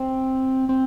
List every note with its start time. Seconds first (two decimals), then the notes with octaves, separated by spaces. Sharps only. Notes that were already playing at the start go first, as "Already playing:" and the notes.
Already playing: C4
0.69 C4